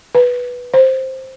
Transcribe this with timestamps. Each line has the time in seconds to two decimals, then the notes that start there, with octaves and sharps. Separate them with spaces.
0.15 B4
0.74 C5